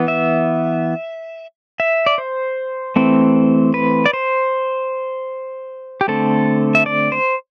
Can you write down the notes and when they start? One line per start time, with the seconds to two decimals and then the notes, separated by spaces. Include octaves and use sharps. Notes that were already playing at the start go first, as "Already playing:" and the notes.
Already playing: E3 B3
0.08 E5
1.80 E5
2.06 D5
2.18 C5
2.96 E3 A3 C4
3.74 B4
4.06 D5
4.13 C5
6.01 G4
6.08 D3 A3 C4 A4
6.75 E5
6.86 D5
7.12 C5